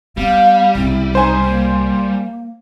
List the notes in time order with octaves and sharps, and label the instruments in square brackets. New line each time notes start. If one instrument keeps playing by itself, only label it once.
[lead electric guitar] G3 [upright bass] B3 [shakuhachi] F5
[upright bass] C2 C#3 [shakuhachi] E4
[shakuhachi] D#4 [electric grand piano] C5 G#5
[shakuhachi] A#3